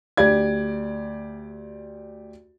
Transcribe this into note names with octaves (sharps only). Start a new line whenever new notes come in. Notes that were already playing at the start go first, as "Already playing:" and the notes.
D2 G4 D5 G#6